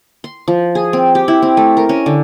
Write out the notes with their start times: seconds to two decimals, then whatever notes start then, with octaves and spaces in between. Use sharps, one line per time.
0.24 C6
0.48 F3
0.75 G#4
0.93 C4
1.15 G4
1.28 E4
1.42 C4
1.57 A3
1.77 A#4
1.89 C#4
2.06 D3